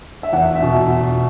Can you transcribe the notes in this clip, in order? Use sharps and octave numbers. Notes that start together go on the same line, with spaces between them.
E5
E2 F#5
E5
B2